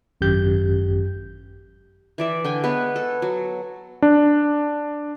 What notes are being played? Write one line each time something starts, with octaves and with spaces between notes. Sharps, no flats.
G#1 F#2 G4 G6
E3 D5 E5
D3 G5 G#5
G#3 B3 B4 C#5
A4
F#3
D4